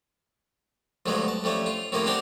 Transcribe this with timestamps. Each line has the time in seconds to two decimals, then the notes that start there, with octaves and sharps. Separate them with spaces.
1.06 D2 G2 F3 F#3 G#3 B3
1.28 A5
1.44 F2 G3 A3 C#4
1.66 F4
1.92 A2 C3 D#3 F3 A#3 C#4
2.06 B3 C4 D4 G4 A#4